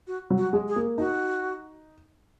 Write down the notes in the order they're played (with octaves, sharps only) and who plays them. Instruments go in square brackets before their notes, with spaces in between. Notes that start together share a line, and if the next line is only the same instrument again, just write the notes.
[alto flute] F#4
[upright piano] F#3
[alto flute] F#4
[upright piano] G#3
[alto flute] G#4
[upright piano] A#3
[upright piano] D#4 [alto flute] F#4